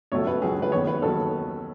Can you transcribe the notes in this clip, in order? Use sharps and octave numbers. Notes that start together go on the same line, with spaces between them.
C#2 B2 F#3 A3 C#5
B4
C#2 B2 F#3 A3 G#4
B4
D#2 D#3 F#3 B3 C#5
B4
D#2 D#3 F#3 B3 A4